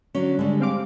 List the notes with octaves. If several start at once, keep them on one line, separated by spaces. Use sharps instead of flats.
D3 F#3 C#4
D3 G3 G#3
C4 F5 D6